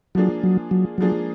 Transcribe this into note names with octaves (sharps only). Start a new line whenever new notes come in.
F3 F#3 A#3 D4 F4 G#4
F#3
F#3
F3 F#3 A#3 D4 F4 G#4